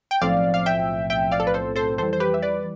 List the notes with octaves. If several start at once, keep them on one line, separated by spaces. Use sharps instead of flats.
G5
B1 A2 F3 A3 C4 D5 F5
F5
E5 G5
E5 G5
D5 F5
A4
B4
A4 C5
A4 C5
F2 E3 G3 A4 C5
C5
G4 B4
E5
B4 D5